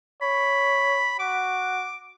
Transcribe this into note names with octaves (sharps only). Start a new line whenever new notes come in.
C#5 B5
F#4 D6